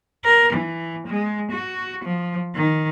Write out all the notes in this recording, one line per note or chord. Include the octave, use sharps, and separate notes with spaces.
A#4
E3
G#3
F#4
F3
D#3